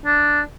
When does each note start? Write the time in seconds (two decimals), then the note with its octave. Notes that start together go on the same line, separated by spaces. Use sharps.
0.05 D4